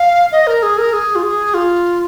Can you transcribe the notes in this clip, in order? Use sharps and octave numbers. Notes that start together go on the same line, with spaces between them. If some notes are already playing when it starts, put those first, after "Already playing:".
Already playing: F5
D#5
A#4
G#4
A#4
G#4
F4
G#4
F4